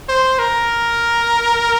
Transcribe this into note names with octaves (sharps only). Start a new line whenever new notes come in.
C5
A#4